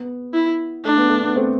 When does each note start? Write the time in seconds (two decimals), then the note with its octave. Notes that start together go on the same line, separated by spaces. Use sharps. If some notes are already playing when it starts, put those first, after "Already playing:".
Already playing: B3
0.34 E4
0.84 A3 D4
0.98 B3
1.10 A3
1.24 B3
1.36 A3 C4